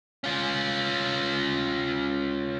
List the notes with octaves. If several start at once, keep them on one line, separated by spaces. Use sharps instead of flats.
C#4 F4